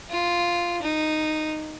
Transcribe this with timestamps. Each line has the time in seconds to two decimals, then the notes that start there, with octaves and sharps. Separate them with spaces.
0.10 F4
0.82 D#4